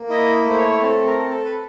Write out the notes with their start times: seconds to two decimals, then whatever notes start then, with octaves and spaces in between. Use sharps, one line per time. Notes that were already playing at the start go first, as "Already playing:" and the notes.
Already playing: A#3
0.09 E4 D#5
0.45 A3 C5
0.58 C#5
0.81 C4 A4
1.06 A#4
1.18 A4
1.30 A4
1.45 B4